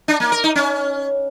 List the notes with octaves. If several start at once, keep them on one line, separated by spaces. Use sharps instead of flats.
D4
A#3
A#4
D#4
C#4